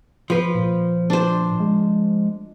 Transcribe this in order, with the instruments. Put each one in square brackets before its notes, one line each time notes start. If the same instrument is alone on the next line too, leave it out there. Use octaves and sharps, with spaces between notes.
[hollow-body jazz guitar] F3 B4
[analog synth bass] A#2
[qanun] D4 C5
[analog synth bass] G#3